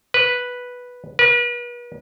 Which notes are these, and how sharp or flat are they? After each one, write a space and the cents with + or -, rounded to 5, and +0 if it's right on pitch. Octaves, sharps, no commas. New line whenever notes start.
B4 -5
B4 -40